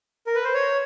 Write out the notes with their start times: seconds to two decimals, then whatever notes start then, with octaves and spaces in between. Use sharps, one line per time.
0.27 A#4
0.35 B4
0.44 C5
0.54 C#5